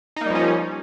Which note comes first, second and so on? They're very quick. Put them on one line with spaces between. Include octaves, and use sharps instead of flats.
D#4 A#3 G3 F3 C#4